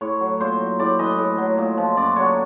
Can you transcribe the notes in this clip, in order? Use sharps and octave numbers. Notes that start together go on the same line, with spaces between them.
A2 C#5
F#3
A#2 C5
F#3
A2 D5
E3 D#5
A2
F#3
A#2
F3
F#2 D5
D3 F#3 C#5